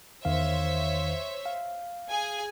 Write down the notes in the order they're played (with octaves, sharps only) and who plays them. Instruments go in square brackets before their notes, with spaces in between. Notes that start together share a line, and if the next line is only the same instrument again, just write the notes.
[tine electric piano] E2 D#3 F5 [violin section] C5 C#5 E5
[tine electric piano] F5
[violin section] G#4 G#5